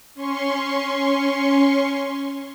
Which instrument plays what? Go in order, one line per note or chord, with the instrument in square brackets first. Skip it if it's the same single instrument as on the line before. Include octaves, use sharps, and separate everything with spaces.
[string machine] C#4 C6 C#6